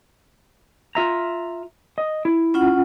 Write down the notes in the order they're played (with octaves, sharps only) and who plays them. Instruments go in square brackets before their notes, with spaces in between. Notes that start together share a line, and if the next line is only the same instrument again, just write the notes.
[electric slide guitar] F4 E5 A#5
D#5
E4
[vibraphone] C#4 F4 F#5